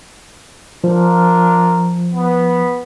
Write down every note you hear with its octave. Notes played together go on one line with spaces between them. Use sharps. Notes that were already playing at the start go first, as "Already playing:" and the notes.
F3 D4 F4 A#4
B3